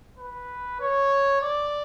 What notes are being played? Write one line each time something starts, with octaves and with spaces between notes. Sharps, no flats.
B4
C#5
D5